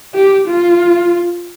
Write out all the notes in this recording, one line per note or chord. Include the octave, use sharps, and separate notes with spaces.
G4
F4